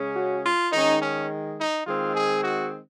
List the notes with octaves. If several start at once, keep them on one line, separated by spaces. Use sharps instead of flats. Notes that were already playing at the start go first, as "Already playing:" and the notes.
Already playing: C#3 G#3 C#4
F#4
F4
D#3 G#3 C#4 D#4
C#4
D#4
D#3 G#3 C4 F4
G#4
F#4